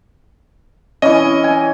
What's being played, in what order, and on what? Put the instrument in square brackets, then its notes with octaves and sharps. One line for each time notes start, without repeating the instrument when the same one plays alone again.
[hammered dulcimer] E3 C#4 [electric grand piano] D#5
[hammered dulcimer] G#5